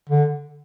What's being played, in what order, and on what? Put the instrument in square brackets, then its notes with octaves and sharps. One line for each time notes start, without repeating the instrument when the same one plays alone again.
[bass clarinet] D3